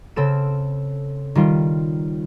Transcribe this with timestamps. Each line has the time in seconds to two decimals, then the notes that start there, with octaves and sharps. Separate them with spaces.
0.16 C#3 C4 A4 E7
1.35 D#3 G3 F4